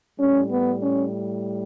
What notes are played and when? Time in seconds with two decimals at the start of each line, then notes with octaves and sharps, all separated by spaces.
0.19 A2 G3 C#4
0.50 B3
0.81 C#4